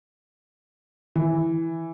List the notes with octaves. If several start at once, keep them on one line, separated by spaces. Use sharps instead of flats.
E3